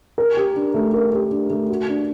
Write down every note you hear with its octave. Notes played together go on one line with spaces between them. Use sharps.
A#4
G4
D4
A3
A#4
G4
D4
A3
F#4
D4